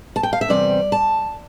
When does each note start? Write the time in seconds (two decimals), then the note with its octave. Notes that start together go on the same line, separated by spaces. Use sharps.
0.16 A5
0.23 G5
0.33 F5
0.41 E5
0.48 E2 C3 G3 C4 D5
0.92 A5